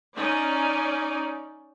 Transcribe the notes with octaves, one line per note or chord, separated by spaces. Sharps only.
C#4 D#4 D5